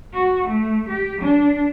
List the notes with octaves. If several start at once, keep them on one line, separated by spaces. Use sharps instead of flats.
F#4
A3
G4
D4